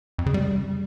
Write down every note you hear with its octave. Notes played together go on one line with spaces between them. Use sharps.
F2
C#3
G3